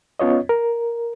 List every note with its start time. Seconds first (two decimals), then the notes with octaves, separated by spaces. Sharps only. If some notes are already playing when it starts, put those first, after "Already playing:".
0.20 B3 C#4 F4 C#5 D#5
0.49 A#4